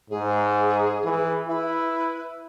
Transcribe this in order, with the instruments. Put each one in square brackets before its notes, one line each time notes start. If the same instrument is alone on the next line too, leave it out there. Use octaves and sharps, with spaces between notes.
[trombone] G#2 [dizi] G#4
[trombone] E3
[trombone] E4 [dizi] B4